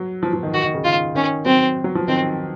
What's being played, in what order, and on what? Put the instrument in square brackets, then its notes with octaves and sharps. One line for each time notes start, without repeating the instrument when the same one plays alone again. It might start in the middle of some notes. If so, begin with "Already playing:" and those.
Already playing: [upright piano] F#3
F3
F3
D#3
[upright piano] D#3 [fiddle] F#4
[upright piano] D#3
C#3
[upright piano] D#3 [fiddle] F4
[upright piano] D#3 [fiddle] C#4
[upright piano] F#3 [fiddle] C4
[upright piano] F#3
F3
[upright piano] D#3 [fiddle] C4